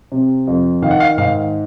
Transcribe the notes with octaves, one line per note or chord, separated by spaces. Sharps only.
C3
F2
D#3 F5
F#5
F5
G#2 F5